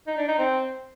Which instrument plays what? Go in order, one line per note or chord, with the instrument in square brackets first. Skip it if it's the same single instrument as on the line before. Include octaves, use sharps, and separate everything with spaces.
[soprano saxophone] D#4
D4
D#4
C4